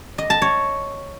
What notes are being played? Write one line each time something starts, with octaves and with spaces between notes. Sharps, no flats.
D#5
A5
C#5